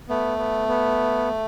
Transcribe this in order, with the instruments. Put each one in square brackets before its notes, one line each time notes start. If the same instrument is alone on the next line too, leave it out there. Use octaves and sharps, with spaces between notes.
[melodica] A3 [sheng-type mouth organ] B3
[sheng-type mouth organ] B3
B3